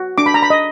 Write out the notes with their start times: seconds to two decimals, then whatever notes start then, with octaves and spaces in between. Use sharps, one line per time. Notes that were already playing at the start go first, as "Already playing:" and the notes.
Already playing: F#4
0.18 D4 D6
0.26 B5
0.34 A#5
0.43 B5
0.50 D#5